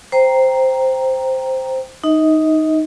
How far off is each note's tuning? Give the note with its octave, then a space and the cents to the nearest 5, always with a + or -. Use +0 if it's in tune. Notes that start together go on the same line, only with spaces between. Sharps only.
C5 +0 G5 +0 A#5 +0
D#4 +0 D#5 +35